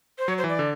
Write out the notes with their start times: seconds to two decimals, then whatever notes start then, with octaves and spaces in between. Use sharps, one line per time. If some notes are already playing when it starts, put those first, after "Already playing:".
0.19 C5
0.28 F#3 C#5
0.38 C5
0.44 E3
0.49 D5
0.59 D3